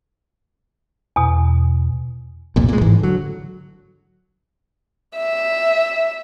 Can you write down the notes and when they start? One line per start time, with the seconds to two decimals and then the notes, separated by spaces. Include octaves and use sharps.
1.16 E2 B2
2.56 C2 F2 A#2
2.69 A#2 G#3
2.81 A1 G#2 E3
2.99 D3 F#3
5.17 E5